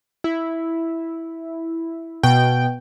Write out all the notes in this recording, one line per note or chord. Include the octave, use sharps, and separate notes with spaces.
E4
B2 G5